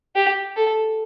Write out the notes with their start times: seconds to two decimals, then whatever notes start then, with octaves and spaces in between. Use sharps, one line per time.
0.16 G4
0.56 A4